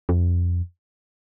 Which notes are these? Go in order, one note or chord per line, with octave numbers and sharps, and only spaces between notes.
F2